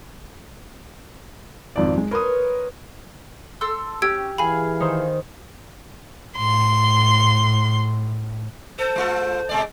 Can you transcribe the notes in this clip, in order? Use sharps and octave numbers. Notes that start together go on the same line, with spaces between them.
G#1 F2 D5
G#3
A#4 B4 C#5 C6 D#6
A4 C6 E6
C#4 G4 E6 G#6 D7
E3 G#4 F5 G#5 B5
D#3 D#4 C5
A2 C6
A4 C5
G#3 F4 A4
B2 G#3 D5